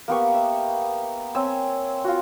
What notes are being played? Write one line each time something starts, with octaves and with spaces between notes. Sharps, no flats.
A#3 B3 G4 C#6
E5
C4 C#5 G#5 E6
F4 F#4